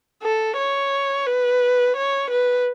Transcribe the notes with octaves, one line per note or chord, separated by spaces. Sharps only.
A4
C#5
B4
C#5
B4